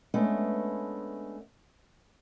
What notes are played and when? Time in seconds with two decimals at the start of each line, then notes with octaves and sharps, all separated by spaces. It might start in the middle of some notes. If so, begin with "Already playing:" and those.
0.14 G#3 A3 B3 C#4 D4